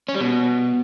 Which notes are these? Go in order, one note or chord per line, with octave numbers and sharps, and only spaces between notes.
C#4
G3
B2